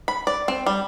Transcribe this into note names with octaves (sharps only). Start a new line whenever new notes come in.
B5
D5
C4
G3